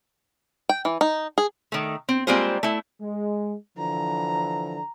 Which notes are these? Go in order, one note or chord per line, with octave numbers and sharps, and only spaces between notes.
G5
E3
D#4
G#4
D#3 A3
C4
G3 G#3 A#3 C4 F4 C5
A3 E4
G#3
D3 E3 F3 A#5